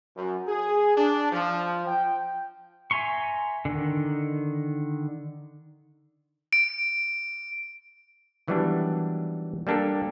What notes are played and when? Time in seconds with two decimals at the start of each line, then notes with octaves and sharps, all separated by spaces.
0.17 F#2
0.47 G#4
0.97 D4
1.32 F3
1.87 G5
2.91 E5 G#5 A#5 C6 C#6
3.65 D3 D#3
6.53 D7
8.48 D#3 E3 F#3 G3 B3 D4
9.67 G3 A#3 D4 G4 A4